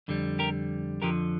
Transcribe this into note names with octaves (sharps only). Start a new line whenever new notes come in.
F2 D3 G3
G4 A#4
F2 D3 F3 G4 A#4